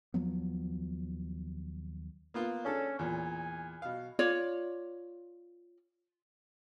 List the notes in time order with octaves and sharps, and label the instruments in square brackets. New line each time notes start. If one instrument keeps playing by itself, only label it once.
[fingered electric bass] D#2 F3 F#3 B3
[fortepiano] A#3 B3 F4
[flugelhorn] C#4 [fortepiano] D4 G#4 A4
[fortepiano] E2 A#2 [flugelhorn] G#5
[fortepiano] B2 F5
[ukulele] F4 C#5 D5